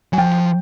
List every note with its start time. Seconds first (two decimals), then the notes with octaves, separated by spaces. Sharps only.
0.13 F#3 G#5
0.18 F3 G5